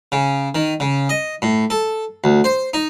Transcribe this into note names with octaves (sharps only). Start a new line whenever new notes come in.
C#3
D#3
C#3
D#5
A2
A4
D2
C5
D#4